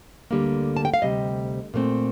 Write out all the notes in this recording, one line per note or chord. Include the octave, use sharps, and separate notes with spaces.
D2 D3 G3 A#3
A5
G5
F5
D2 C3 G3 D#5
A#2 A3 C4